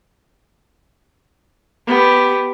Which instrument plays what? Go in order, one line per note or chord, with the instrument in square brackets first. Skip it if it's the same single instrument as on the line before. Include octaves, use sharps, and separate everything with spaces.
[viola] B3 G4